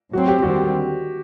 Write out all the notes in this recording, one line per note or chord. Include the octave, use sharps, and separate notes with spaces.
A2 F#3 C4 F#4
G4
D#2 D3 G3 C4 F#4